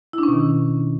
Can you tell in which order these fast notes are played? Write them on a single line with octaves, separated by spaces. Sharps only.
E4 D4 C#4 B2 D#3